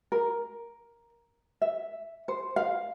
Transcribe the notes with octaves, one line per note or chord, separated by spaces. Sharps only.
A#4
E5
C5
F5